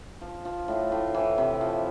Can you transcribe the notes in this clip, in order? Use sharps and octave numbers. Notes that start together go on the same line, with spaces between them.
F3
F3
A2
A2
E3
C3
F3